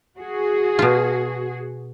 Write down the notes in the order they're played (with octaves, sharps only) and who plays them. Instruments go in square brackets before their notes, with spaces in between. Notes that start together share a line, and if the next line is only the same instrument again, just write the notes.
[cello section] F#4 G#4
[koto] B2 F4